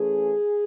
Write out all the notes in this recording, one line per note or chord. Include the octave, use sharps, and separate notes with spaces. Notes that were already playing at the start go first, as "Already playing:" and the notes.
Already playing: E3 A3 C#4 G#4